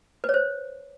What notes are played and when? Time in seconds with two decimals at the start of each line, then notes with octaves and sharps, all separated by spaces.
0.24 B4
0.29 C#5
0.34 C5